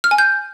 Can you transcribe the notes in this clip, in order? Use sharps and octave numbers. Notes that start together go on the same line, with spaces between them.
F6
G#5
G6